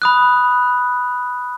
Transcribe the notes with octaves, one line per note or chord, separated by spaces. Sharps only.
B5 D#6 F#6